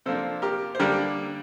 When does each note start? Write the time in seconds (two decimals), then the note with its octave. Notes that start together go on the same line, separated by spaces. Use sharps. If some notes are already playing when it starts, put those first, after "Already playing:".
0.06 C3 F3 A#3 D4 A4 C5
0.42 G4 A#4
0.75 C5
0.79 D3 G3 A#3 D4 G4 A#4